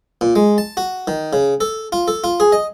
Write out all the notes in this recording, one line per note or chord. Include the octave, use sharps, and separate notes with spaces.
A#2
G#3
A5
F#4
D#3
C#3
A4
F4
A4
F4
G#4
D#5